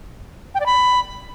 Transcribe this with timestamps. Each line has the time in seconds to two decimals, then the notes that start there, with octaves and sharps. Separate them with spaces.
0.54 G5
0.60 D5
0.66 B5